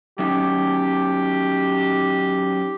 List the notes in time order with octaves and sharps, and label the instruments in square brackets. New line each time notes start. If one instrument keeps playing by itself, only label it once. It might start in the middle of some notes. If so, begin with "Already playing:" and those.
[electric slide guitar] F#3 C#4 D#4 [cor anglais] G4